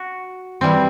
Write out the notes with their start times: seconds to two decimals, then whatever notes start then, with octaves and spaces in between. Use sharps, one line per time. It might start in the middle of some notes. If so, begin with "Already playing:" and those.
Already playing: F#4
0.61 E3 G3 C4